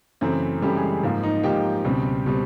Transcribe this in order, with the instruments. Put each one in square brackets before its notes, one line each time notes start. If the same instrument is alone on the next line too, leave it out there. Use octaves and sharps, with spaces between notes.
[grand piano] F#2 C#3 E3 A3 C4 C5
F#2 C#3 E3 G3 A3 G4
G#3 G#4
G#2 F3 A#3
D#4 D#5
G#2 F3 A#3 G4 G5
C#2 B2 G3 C4
B2 G3 C4